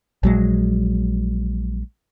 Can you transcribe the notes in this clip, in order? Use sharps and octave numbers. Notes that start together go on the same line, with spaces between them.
A#1 F#3 G#3